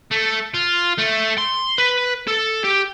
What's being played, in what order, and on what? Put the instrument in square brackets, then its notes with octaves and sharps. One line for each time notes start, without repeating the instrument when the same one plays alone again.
[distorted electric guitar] A3
F4
A3
C6
B4
A4
G4